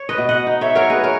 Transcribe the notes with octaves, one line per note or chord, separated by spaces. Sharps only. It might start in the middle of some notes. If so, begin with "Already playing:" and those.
Already playing: C#5
B4 D#5
B2
D#5 F#5
D#4
C#5 E5
F#3 A#4 C#5
G#4 B4
A#4 C#5